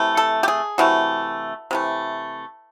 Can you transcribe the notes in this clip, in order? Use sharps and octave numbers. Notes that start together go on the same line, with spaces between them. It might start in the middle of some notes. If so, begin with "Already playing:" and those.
Already playing: C3 E3 A3
A4
G4
G#4
C3 E3 A3 F#4
C3 E3 A3